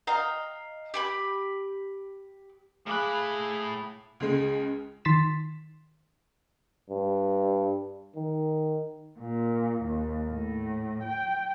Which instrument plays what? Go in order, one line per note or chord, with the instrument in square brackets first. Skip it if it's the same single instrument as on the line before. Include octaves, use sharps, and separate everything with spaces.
[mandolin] D#5 F5 G5 A#5
G4 G5 B5
[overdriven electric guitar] A2 B5 [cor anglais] G#4 [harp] F5 D6 F#6
[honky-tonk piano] C#2 C#3 G#3
[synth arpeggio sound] D#3 C6 A6 B6 E7
[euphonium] G2
D#3
[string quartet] A#2
D#2
A2
G5